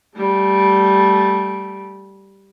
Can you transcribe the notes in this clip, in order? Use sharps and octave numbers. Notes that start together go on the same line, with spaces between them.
G3 A3